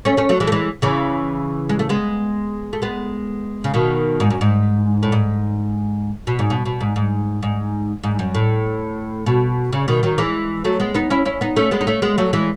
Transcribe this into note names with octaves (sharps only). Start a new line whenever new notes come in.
A3 C#4
A3 C#4
F#3 A3
E3 G#3
A3
E3 G#3
C#3 E3
G#3
A3
G#3 B3
A3
G#3 B3
C#3
B2 D#3
G#2
F#2
G#2
A2
G#2
B2
G#2
B2
B2
G#2
G#2
G#2
G#2
F#2
A2
B2
C#3
B2 D#3
D#3 F#3
E3 G#3
F#3 A3
G#3 B3
B3 D#4
C#4 E4
C#4 E4
B3 D#4
A3 C#4
G#3 B3
D#4
A3 C#4
G#3 B3
F#3 A3
E3 G#3